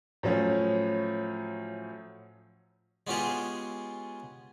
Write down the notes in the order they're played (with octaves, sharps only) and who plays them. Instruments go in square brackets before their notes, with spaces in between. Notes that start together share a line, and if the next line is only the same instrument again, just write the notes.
[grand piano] A2 F3 F#3 C#4
[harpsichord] G#3 B3 C#4 F4 G4 G#4